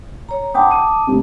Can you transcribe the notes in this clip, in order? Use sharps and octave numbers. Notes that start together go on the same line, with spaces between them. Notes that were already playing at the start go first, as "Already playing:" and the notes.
C#5 A#5
F#5 G5 A5 B5 D6 D#6
D#7
F1 C2